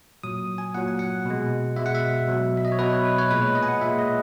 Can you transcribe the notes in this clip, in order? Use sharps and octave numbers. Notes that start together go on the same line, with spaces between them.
A#2 F#3 D#6
G#5
A#2 F#3 F#5
G#5
F#5
B2 G#3
B2 G#3 E5
F#5
E5
B2 F#3
E5
D#5
C#5
B2 F#3 B4
C#5
B4
C#5
A#2 G#3 B4
C#5
D#5
G#5
F#5
A#2 G#3 E5
D#5